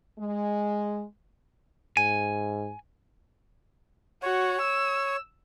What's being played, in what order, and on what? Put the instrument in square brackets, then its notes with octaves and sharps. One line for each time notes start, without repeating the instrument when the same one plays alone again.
[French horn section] G#3
[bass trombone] G#2 [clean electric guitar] G#5
[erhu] F#4 [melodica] C#5
[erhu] E6